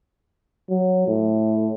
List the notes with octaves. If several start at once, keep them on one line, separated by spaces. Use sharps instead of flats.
F#3
A2